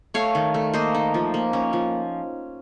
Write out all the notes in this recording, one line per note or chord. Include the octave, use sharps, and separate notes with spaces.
A3 C#5 F5
D#3
A3
A#3 C5 D#5
D#4
F3
A#3
C#4
F3